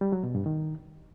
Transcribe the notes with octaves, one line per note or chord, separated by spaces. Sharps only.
G3
F#3
B2
G2
D#3